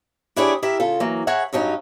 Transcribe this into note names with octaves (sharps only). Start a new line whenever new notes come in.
D4 E4 G4 G#4 C#5 D5
E4 G4 A#4 E5
C#3 F4 A4
E3 F#3 A#3
G#4 A#4 C#5 E5 F#5
G2 F#3 C#4 D#4